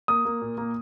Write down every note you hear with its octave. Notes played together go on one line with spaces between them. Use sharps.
A#3 D#6
A#3
A#2
A#3